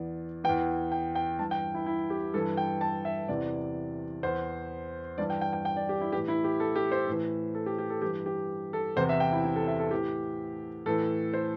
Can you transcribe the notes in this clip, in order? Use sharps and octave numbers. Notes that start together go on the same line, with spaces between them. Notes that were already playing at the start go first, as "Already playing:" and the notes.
Already playing: E2 E3 D5
E3 G5
E2
G5
G5
G2 E3 A5
G5
E4
E4
G4
G2 E3 A4
G5
A5
E5
E2 C3 E3 D5
E2 E3 C5
G2 E3 D5
G5
G5
G5
G5
D5
G4
E4
A2 E3 G4
E4
G4
A4
G4
C5
A2 E3
A4
G4
G4
A4
G2 E3 G4
G4
A4
E2 C3 E3 C5
E5
G5
E4
E4
A4
E5
A4
A2 E3 G4
A2 E3 A4
C5